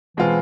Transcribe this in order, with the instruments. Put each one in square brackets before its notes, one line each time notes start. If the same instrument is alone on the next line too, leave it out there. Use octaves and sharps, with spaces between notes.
[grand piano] B2 G#3 C4 F4 [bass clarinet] E3